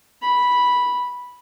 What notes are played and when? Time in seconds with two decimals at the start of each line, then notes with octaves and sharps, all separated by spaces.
0.22 B5